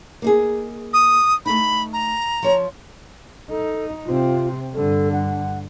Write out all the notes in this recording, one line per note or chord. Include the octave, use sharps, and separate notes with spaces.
A#3 D#4 G#4
D#6
A3 D#4 B5
A#5
F3 C#5
D#4 A4
C3 C4 F4
G2 D3 A4
F#5